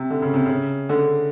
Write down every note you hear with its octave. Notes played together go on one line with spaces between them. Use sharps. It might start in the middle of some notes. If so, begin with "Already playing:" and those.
Already playing: C3
D3
C#3
C3
C#3
D3